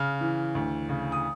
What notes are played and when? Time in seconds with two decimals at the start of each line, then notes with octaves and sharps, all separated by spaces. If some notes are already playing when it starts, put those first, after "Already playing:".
Already playing: C#3 F6
0.21 E3
0.55 D2
0.89 C#3
1.12 D#6